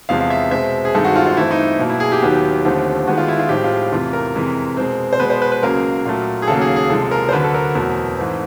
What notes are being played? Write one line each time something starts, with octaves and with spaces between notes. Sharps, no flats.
E2 C3 F3 G#3 F5
F5
E5
B2 G#3 C4 E5
G#4
G2 D#3 G#3 C4 A4
F#4
F4
F4
G2 E3 A3 C4 E4
D#4
B2 F#3 A#3
E4
G#4
G4
D#2 D#3 F#3 B3
D#2 D3 F3 A3 C4
D#2 D#3 G#3 B3 F#4
F4
E4
F4
A2 F3 G#3 C4 G4
F4
E2 C3 E3 A3 F4
A#4
F2 C3 E3 G#3
B2 G#3 C4
C5
B2 G#3 B3 B4
C5
B4
B4
C#2 C#3 F#3 A#3 A#4
A#2 F#3 A3
G#4
D#2 C#3 F#3 A#3 A4
G#4
G#4
C2 C3 F3 G#3 A4
A#4
C5
D2 D3 F#3 B4
A4
A#4
E2 B2 F#3 A3 C4
G#2 E3 A3 C4